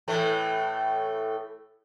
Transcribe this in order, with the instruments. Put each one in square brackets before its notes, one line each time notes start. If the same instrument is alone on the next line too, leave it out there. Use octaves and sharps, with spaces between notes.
[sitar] A2 E3 A3